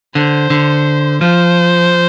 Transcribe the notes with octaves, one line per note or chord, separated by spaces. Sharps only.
D3 C5
D3
F3 C5